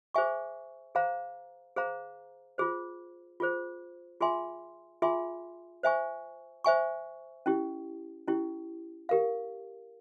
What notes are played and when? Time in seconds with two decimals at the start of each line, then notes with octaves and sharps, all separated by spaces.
0.14 G#4 C5 E5 G#5 C#6
0.95 G#4 C5 F5 A#5
1.76 G#4 C5 F5 A#5
2.58 F4 G#4 C5
3.40 F4 G#4 C5
4.21 F4 G#4 E5 G#5 C6
5.02 F4 G#4 E5 G#5 C6
5.83 C5 E5 G#5 C#6
6.64 C5 E5 G#5 C#6
7.46 C#4 E4 G4
8.27 C#4 E4 G4
9.09 G4 A#4 F5